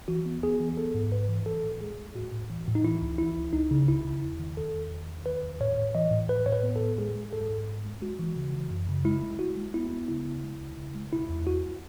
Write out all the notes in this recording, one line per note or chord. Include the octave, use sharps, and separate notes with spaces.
E3 F#4
B3
B3 G#4
E3
B3 A4
G#2
G#2 B4
E3
E3 A4
A2
G#3 G#4
G#3
A2 F#4
A2
E3
A2
D#4
E3 E4
C#2
E3 E4
C#2
C#2 D#4
C#3
C#2 E4
C#3
E2
D#3
D#3 A4
E2
E2
D#3
D#3 B4
E2
A2 C#5
A2
E3 D#5
A2
A2 B4
A2 C#5
B4
B3
A4
A2
G#3 G#4
G#3
G#2 A4
G#2
G#2
G#3
G#3 F#4
E3
C#3
E3
F#2
C#3
G#3 E4
G#3
G#3 F#4
G#3
B3 E4
B3
C#3 E4
C#3
G#3
C#2
C#3
G#3
B2 E4
E2
E2 F#4